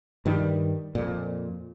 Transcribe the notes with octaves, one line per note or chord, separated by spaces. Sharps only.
G2 D#3 G3
F2 A#2